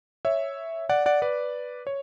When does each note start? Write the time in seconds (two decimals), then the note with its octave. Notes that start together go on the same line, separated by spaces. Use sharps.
0.25 C#5 E5
0.89 D5 F#5
1.06 D5 F#5
1.22 B4 D5
1.87 C#5